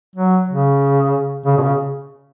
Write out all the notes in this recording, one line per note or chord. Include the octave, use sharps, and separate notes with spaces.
F#3
C#3
C#3
B2
C#3